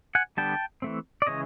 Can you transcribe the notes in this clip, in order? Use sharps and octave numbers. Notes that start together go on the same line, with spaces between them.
F#5 G#5
D3 G3 B3 D4 G5 A5
E3 A3 C4
D5
C#3 E3 G#3 C#4 C#5 D#5